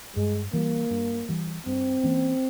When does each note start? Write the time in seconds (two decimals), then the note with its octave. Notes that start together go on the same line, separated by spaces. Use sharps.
0.16 G2 G#3
0.53 E3 G3 A#3
0.91 G2
1.29 E3 G3
1.66 G2 C4
2.04 E3 A#3 C#4